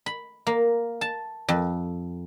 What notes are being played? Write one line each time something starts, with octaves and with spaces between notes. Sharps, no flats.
B5
A#3
A5
F2